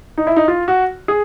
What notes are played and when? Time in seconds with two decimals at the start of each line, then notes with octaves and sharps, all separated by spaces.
0.18 D#4
0.27 E4
0.36 D#4
0.48 F4
0.68 F#4
1.08 G#4